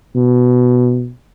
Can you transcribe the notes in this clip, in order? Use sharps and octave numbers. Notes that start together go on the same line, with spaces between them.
B2